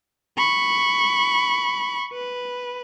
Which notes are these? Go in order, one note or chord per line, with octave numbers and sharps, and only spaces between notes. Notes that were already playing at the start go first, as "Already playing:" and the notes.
B5 C#6
B4